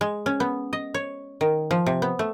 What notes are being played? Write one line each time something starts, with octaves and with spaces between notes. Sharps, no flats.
G#3
C#4
B3
D#5
C#5
D#3
F3
C3
B3
A3